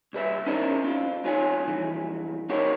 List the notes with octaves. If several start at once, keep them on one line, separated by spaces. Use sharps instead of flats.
C2 G3 B4 E5
C#4 D#4 E4 A#4 C5 D5
C4 F4
F#2 D#4 F4 C#5 G#5
C2 F2 C3 E3
C4 D#4 F#4 G4 A#4 C#5